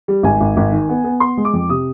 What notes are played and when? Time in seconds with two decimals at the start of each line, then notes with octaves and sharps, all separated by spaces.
0.08 G3
0.23 G#1 G#5
0.41 G#1
0.57 G#1
0.72 D#3
0.89 B3
1.04 B3
1.20 B3 C6
1.37 G#3
1.45 D6
1.53 F2
1.69 C3 D#6